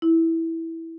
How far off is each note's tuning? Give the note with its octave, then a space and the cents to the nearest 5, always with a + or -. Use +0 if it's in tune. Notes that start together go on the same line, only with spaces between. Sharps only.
E4 -10